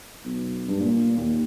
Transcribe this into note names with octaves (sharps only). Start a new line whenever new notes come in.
B1
G2
A#2
D#2